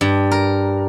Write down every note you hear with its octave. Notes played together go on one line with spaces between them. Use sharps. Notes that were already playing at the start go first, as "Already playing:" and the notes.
G2
A#4